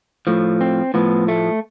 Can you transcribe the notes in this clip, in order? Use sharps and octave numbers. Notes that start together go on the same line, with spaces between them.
A2 F3
C4
A2 F3 B3
A3